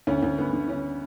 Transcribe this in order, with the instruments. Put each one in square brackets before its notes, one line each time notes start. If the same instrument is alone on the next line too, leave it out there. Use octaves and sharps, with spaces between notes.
[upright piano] D2 C#4
D2
D2 B3
D3
D3 C#4